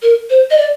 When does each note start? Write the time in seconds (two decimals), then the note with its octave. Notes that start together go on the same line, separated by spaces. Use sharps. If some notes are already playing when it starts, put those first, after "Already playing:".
0.02 A#4
0.30 C5
0.51 D#5
0.57 D5